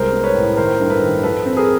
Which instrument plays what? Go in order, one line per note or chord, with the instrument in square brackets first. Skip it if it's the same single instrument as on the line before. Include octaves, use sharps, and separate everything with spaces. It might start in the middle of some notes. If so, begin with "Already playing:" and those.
Already playing: [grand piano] C2 G#3 A#4 C5
B3
B4 C#5
A2
D#3 A#4 C5
G2 A#4
A4 B4
D#3
F3 A4 B4
C4
G#4 A#4